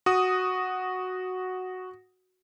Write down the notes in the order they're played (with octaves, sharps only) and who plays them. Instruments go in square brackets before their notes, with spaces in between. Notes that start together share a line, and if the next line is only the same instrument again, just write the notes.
[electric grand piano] F#4 D#6